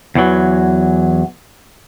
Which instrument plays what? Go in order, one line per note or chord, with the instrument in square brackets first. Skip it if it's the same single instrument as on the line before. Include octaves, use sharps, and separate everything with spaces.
[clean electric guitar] E2 E3 F#3